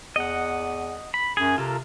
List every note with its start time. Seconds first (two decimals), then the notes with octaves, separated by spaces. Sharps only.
0.16 E2 D#5 F#5
1.14 B5
1.37 F#2 G#4
1.58 C3 F4 A4 A#4